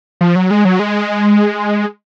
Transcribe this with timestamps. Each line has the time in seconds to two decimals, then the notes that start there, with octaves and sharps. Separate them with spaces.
0.21 F3
0.36 F#3
0.51 G#3
0.65 F#3
0.79 G#3